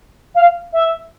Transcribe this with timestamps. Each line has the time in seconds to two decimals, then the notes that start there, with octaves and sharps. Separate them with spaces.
0.35 F5
0.72 E5